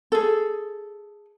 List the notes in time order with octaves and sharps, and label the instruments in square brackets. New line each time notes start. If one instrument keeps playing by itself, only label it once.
[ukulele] G#4 A4